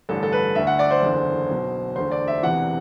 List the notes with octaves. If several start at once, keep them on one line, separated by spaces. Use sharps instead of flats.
A1 G2 D3 A4
A4
B4
D2 D3 E5
F#5
D5
C5
F#1 E2 D3
B1 B2
E1 D2 D3 C5
D5
E5
E1 E2 C3 E3 F#5